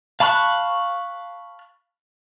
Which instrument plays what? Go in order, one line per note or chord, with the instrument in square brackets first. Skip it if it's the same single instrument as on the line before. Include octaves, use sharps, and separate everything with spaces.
[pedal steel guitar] F5 A5 B5 C#6 F#6